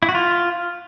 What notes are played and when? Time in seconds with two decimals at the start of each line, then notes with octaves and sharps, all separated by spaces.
0.03 E4
0.09 F#4
0.15 F4